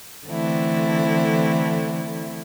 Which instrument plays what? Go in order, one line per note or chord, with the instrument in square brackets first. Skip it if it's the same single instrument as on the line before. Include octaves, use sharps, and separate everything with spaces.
[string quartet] D3 E3 A3 C4 E4